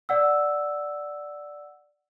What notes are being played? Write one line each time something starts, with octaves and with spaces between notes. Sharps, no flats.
D5 F#5 E6